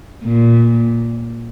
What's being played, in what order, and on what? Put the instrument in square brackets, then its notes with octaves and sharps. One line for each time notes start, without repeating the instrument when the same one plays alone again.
[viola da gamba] A#2